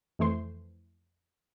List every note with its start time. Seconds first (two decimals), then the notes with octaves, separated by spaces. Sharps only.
0.19 F2 E3 A3 C5 C6